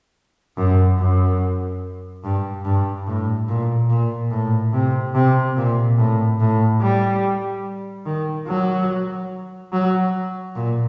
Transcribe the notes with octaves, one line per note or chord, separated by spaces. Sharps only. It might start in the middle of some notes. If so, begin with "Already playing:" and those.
F#2
F#2
G2
G2
A2
A#2
A#2
A2
C3
C3
A#2
A2
A2
G3
D#3
F#3
F#3
A#2